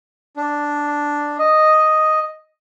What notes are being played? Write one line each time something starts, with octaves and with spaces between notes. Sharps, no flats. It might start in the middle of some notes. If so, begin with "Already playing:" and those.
D4
D#5